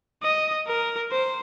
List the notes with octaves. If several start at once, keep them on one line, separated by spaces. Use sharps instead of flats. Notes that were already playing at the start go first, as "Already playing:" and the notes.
D#5
A#4
C5